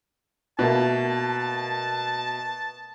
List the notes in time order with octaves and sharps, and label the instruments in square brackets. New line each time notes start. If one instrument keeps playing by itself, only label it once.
[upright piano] B2 A3 A#3 [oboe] A5